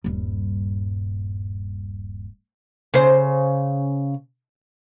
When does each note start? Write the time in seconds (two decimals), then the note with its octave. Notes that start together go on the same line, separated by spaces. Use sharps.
0.04 D#1 G2
2.94 C#3 C5